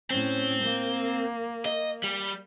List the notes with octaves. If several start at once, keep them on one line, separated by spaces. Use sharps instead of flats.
A2 C4 C#4
A#3
D#5
G3